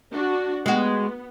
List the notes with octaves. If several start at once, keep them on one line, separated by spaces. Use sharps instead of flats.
D4 F#4
G#3 B3 F#4